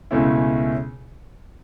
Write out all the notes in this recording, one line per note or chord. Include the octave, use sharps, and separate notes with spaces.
C#2 B2 A3 C#4 E4